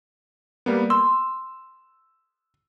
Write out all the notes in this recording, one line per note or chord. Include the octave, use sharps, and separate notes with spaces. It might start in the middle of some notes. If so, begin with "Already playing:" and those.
G3 A#3 B3
C6 E6